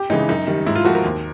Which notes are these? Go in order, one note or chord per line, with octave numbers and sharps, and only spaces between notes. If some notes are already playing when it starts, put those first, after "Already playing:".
Already playing: G4
C#3 E3 G#3 D#4
F#2 D#4
D#3 G3
G#2 E4
F4
F3 A3 F#4
A#4
D#2